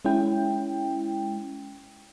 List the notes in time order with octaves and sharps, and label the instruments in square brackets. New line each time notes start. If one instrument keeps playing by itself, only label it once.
[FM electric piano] G#3 C#4 E4 G5